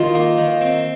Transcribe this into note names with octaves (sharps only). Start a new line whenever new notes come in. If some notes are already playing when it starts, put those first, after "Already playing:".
Already playing: D#3 F4
A#3
D#3
C4